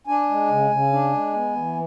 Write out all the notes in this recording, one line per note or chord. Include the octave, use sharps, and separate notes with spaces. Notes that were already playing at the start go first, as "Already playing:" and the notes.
D4 G#5
G#3
C#3
C#3
D4
G#3
B3
E3